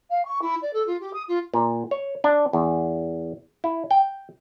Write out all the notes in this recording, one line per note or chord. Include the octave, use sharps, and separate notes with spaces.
F5
C#6
E4
D5
A4
F4
G4
D#6
F4
A#2
C#5
D4
E2
E4
G5